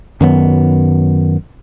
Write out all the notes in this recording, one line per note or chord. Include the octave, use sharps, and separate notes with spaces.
F#2 D#3 F#3 B3